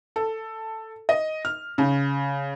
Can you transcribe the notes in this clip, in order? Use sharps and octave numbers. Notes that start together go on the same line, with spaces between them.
A4
D#5
F6
C#3